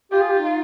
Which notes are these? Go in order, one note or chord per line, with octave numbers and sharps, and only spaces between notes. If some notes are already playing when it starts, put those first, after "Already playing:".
F4 G4
G#4
G4
D#4